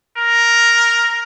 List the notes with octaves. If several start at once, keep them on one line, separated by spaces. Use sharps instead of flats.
A#4